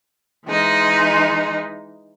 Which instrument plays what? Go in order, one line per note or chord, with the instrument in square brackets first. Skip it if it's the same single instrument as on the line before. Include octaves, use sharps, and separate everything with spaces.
[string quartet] E3 G#3 D#4